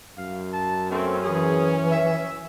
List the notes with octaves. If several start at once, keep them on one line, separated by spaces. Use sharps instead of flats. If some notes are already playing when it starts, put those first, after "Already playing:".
F#2 F5
A5
A3 A#3 C4 C#4
E3 G#4
E5